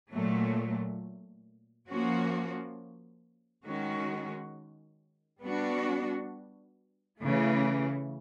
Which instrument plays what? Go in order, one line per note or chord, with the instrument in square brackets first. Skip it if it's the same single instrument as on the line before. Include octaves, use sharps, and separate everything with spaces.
[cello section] A#2 F#3 A3
F3 A#3 C#4 F#4
D#3 G#3 C#4 F#4
G3 B3 D4 F#4
C#3 E3 A3